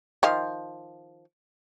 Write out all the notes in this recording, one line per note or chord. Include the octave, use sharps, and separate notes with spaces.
D#3 F3 F5